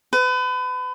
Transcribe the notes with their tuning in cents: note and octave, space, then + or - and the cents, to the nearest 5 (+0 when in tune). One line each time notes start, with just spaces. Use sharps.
B4 +35